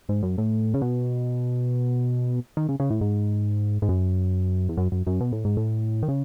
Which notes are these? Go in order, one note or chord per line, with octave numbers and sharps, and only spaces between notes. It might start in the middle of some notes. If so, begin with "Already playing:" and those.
G#2
F#2
A2
C#3
B2
D#3
C#3
C#3
A2
G#2
G#2
F#2
E2
F#2
F#2
F#2
B2
A2
G#2
A2
D#3
C#3